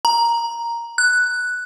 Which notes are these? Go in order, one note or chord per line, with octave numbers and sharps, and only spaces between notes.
A#5
F#6